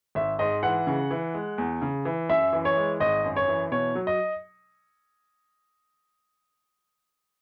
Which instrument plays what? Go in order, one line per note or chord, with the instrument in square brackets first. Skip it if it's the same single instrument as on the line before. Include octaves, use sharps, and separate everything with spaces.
[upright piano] G#1 E5
G#2 D#5
E3 F#5
C#3
E3
G#3
E2
C#3
E3
F#2 E5
E3
C#5
G#3
G#1 D#5
F#2
C#5
E3
B2 C#5
F#3
D#5